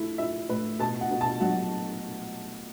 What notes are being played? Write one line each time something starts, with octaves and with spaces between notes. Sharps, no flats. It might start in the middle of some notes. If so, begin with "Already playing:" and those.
Already playing: A3 E4
E4 E5
A2 B4
B2 A5
F#5
B2
A5
F#3 F#5